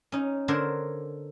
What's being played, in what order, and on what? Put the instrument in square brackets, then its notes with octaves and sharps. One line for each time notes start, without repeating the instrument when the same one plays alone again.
[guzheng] C#4 D#4
D3 D4 A#4 C5 C#5